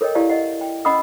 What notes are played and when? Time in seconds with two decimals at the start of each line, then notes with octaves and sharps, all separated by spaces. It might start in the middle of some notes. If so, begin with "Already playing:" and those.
0.01 A4 A#4 C#5 D#5 G5
0.15 E4 G4 D5 F5 A5
0.29 D#5 F#5
0.61 G5
0.85 C#4 D#5 F#5 B5 D#6 E6